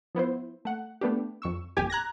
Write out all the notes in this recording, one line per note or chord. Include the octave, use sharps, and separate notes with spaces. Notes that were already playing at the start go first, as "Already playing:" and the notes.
F3 B3 E4 C5
A3 F#5
A3 B3 D4 G4
F2 C#6 E6
G1 F2 A#2 G4 G#5
A#5 F#6 G#6 A#6